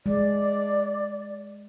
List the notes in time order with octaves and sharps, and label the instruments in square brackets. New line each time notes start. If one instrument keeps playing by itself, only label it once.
[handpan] G#3 [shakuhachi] D5